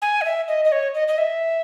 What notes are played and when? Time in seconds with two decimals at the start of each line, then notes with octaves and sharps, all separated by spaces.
0.02 G#5
0.21 D#5
0.25 E5
0.48 D#5
0.65 D#5
0.72 C#5
0.95 D#5
1.08 D#5
1.18 E5